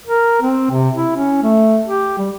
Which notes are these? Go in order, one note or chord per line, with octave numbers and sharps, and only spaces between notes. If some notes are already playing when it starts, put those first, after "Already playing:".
A#4
C4
C3
E4
C#4
A3
G4
G3